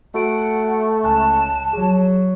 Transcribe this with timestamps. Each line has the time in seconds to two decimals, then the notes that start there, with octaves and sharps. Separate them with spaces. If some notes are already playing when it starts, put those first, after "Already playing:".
0.15 A3 F#4 F#5 D7
1.04 C#2 G#5 A5 F#6
1.73 F#3 G#4